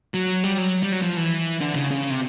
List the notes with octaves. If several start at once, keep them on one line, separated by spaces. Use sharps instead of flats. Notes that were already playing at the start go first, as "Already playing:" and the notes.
F#3
G3
F#3
G3
F#3
F3
E3
D3
C#3
C#3
C3